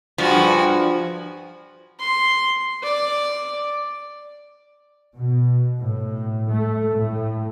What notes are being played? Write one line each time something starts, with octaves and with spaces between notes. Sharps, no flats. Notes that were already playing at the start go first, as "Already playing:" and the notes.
G2 F3 F#4 G#4
C6
D5
B2
A2
A3
A2